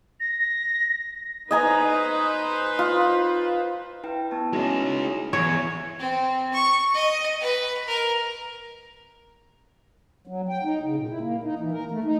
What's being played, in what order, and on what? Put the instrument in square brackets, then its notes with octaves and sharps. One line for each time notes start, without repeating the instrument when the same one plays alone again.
[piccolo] A#6
[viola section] D#4 B4 C5 [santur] D#5 G#5 A#5
[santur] F4
[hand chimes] E4 B4 G5
B3 A5
[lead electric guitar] G#3 C#4 [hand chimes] D#4 E4 F#4
[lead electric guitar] E2 [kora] C#5
[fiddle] C4
C#6
D#5
B4
A#4
[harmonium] F#3
G5
D#4
C#3
A#2
E4
A#3
D#4
E3
A#4
A3
D#4